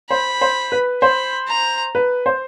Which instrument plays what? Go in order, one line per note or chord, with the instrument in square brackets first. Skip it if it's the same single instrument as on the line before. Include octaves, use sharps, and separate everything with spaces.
[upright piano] C5 [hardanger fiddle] B5
[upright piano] C5
B4
[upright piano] C5 [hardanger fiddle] B5
[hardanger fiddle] A#5
[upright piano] B4
C5